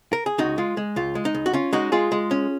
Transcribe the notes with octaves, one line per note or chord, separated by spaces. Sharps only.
A#4
G#4
C#2 D#4 F#4
G#3 F4
G#3
C#2 F4
G#3
D#4
C#2
F#4
C#4 F4
G#3 D#4 F#4
G#3 F4 G#4
G#3
C#4